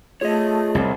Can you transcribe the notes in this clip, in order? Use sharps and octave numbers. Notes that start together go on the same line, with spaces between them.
A3 F4 G#4 C#5 D#5
C2